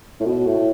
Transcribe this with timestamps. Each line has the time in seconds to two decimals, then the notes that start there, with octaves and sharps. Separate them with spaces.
0.20 A2
0.26 B2
0.47 A2